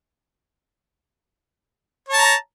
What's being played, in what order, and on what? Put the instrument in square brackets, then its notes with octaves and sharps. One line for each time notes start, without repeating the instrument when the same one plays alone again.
[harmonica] C#5
A5
A#5